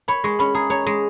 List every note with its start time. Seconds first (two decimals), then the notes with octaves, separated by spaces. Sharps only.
0.08 C#5 B5
0.24 G#3 C#6
0.39 C#4 B5
0.55 G#4 A#5
0.70 C#5 A#5
0.87 G#3